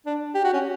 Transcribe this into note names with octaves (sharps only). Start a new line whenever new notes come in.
D4
G4
F#4
C#4